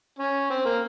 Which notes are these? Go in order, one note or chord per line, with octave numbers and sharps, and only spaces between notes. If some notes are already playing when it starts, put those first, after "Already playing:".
C#4
C4
A#3